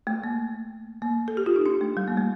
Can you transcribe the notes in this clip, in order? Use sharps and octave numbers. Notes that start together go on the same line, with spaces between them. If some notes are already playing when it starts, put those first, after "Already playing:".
A3
A#3
A#3
A4
G4
F4
D#4
D4
A3
G3
A#3
A3